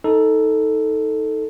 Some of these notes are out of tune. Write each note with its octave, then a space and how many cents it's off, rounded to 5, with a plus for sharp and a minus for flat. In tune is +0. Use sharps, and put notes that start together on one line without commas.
D#4 +20 A4 +5